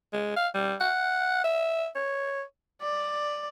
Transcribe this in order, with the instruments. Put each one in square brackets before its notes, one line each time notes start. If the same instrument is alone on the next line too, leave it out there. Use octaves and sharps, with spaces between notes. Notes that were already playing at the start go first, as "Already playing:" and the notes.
[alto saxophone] G#3
F5
G3
F#5
E5
C#5
[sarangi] D5